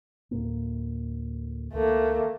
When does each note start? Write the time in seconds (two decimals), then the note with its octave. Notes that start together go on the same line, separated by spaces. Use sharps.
0.31 D2 A2 A#3
1.73 C#2 D#3 A3 A#3